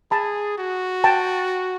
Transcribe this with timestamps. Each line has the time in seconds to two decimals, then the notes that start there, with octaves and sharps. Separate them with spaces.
0.11 G#4 A5 B5
0.58 F#4
1.04 G5 A5